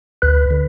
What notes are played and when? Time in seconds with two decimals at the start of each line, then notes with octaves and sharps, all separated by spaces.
0.22 D2 B4
0.50 D3